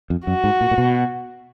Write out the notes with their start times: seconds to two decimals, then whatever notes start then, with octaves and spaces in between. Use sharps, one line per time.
0.10 F2
0.27 F#2 F#4
0.44 G#2
0.61 A#2
0.71 A#2
0.78 B2